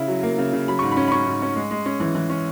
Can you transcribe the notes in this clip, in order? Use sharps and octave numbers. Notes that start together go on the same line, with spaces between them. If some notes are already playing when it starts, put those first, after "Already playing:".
Already playing: C#3 E4
F#3
A#3
C#3
C#3
F#3 B5
G#2 C#6
B5
C#4
B5
C#4 C#6
G#2
C#4
G#3
G#3
C#4
E3
E3
C#4